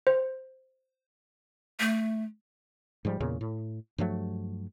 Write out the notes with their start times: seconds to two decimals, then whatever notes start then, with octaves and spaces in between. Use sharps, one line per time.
0.07 C5
1.80 A3
3.05 G#2 F3 G3
3.20 E2 A#2 C#3
3.41 A2
3.98 G2 F3 F#3 A3